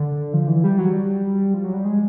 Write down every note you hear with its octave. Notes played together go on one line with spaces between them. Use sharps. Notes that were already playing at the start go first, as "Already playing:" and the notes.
Already playing: D3
F3
E3
G3
F#3
G3
F3
F#3
G3
G#3